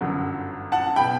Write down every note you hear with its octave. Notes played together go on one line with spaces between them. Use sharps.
G1 F#2 D3 F#3
F#5 A5
B2 G5 B5